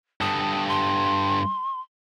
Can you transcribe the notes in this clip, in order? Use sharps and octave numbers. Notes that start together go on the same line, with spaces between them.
G2 A4 D#6
C6